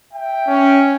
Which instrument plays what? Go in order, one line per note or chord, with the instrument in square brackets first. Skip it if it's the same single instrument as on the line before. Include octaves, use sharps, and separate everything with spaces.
[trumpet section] E5 G5
[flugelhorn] C#4